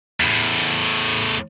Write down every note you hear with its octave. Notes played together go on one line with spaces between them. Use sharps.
E2 A2